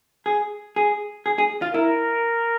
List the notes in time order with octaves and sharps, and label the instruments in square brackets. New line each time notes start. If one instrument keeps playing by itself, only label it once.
[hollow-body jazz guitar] G#4
G#4
G#4
G#4
F4
[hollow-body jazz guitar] E4 [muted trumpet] A#4